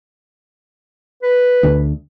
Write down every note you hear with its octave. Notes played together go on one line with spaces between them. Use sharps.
B4
D2